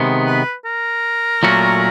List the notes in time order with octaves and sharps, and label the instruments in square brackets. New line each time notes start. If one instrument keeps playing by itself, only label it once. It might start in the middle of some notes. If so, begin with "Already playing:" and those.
Already playing: [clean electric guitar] C3 D#3 G#3 B3
[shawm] B4
A#4
[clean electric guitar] A#2 F#3 A3 C#4 F#4